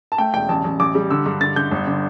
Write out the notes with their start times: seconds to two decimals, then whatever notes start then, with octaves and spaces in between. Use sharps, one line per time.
0.12 A5
0.18 A3 G5
0.34 E1 G5
0.49 A1 A5
0.64 A1
0.80 A1 D6
0.95 G3
1.10 D3 E6
1.26 G2
1.41 D3 A6
1.56 D3 G6
1.71 G1
1.87 D3